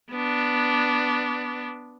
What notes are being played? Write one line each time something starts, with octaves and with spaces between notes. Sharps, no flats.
B3 D4